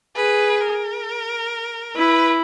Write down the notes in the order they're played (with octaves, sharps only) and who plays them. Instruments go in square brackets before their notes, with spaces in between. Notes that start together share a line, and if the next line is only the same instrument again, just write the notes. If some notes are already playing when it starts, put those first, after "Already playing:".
[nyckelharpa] G#4 [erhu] B4
[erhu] A#4
[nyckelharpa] E4 [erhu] B4